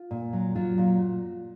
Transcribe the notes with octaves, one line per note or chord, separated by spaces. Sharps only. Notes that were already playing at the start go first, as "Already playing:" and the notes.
Already playing: F4
A#2
F#3
F#3 F4
A#2